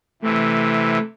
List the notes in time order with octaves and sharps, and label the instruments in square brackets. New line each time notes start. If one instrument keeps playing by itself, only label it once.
[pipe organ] C3 E3 [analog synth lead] A3